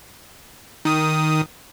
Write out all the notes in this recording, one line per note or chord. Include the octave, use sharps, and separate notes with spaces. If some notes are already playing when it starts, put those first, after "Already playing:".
D#3 D#6